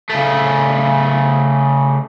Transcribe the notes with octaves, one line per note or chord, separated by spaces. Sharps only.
C#3 A3